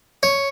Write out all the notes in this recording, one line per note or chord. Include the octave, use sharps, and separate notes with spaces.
C#5